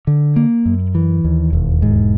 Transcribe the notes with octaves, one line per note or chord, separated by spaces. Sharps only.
D3
A#3
F#2
E3
D#2
E1
G#2